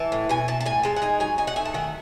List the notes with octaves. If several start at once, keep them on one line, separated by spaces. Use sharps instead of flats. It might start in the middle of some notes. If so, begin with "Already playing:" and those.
Already playing: E3 A5
A2
B2 G#5
B2 A5
A5
A2 G#5
G#3 A5
F#5
D#4 G#5
F#3 G#5
D#4 G#5
F#5
A3 G#5
A5
D#3 F#5